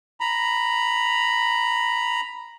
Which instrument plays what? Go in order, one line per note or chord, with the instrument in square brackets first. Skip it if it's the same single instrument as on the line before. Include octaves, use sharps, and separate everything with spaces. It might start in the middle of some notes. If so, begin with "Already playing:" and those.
[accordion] A#5 B5